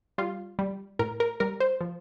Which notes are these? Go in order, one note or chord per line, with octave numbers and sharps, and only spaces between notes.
G3 F4
G3
A2 A#4
A#4
G3 A#4
C5
F3